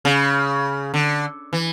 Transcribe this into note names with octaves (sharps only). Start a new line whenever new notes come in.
C#3
D3
E3